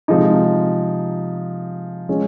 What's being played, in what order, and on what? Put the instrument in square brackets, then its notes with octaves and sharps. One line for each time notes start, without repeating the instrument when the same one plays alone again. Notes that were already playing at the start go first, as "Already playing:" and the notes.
[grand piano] C3 F3 G#3 D#4
F3 G#3 C#4